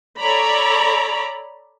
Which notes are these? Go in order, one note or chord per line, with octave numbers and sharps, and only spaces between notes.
A4 C#5 D5 A#5 B5